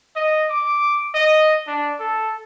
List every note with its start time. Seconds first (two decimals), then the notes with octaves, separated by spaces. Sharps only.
0.16 D#5
0.50 D6
1.14 D#5
1.67 D4
2.00 A4